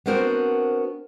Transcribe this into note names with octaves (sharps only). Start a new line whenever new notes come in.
B3 C4 D4 F#4 A#4 C5